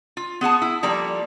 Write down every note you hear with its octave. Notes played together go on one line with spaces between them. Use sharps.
F4
B3 G#4 F#5 A5
E4
F3 G3 A#3 A4 D5